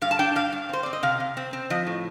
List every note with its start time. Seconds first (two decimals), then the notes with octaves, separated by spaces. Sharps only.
0.02 G2 F5
0.11 A5
0.19 D4 G5
0.35 G2 F5
0.53 G2
0.69 C4 C5
0.83 C4 D5
0.93 D#5
1.03 C3 F5
1.20 C3
1.37 C4
1.53 C4
1.70 F3 D#5
1.87 A2